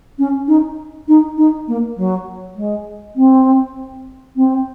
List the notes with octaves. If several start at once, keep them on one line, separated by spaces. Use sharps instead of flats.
C#4
D#4
D#4
D#4
A#3
F#3
G#3
C4
C4